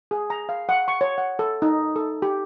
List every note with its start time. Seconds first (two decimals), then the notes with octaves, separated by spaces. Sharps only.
0.11 G#4
0.30 A#5
0.49 F5
0.69 F#5
0.88 C#6
1.01 C#5
1.18 F#5
1.39 A4
1.62 D#4
1.96 A4
2.22 G4